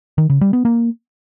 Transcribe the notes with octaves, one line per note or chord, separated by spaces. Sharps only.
D#3
C#3
G3
B3
A#3